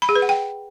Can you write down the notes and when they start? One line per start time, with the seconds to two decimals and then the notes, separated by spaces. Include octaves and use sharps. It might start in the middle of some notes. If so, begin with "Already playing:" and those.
0.02 B5
0.09 G#4
0.16 B4
0.22 F#5
0.29 G5